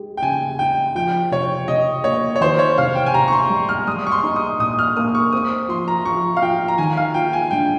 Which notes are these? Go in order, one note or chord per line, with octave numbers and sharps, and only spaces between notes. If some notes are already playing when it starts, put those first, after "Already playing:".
Already playing: G#3 G4
G5
C#3 G#5
D#4 G5
F3 G5
C3 C#5
C3 D#5
A#3 C#5
C#5
D#3 C5
C#5
C3 F5
G5
G#5
C3 A#5
C#6
C6
G3
F6
G3 D#6
C#6
C6
D#4
D#6
A#2 D#6
F6
A#3 D#6
C#6
C4 D#6
F3 C6
A#5
F3 C#6
F5
F4 G5
A#5
D#3 G#5
F5
F4 G5
G#5
G2 G5